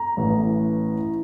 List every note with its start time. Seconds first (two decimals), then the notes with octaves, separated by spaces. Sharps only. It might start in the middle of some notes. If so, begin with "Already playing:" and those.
Already playing: A#5
0.17 A1 A2 E3